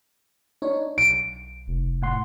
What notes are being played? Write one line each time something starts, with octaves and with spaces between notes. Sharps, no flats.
D4 D#4 C#5
B1 D7
F1
A2 F#5 C6